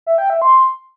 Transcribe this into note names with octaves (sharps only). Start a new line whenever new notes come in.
E5
G5
E5
C6